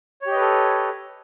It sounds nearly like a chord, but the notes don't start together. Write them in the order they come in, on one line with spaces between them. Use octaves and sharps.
C#5 G4 D#5 B4 A4